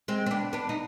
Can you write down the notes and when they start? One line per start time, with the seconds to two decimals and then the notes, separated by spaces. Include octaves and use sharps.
0.08 G#3 C4
0.26 C4
0.31 B3 D4
0.53 B3 D4
0.69 D#4